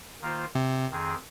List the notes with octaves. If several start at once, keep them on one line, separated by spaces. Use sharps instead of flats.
D#3 A#3 F4 C5
C3
F2 D#3 C4 G#4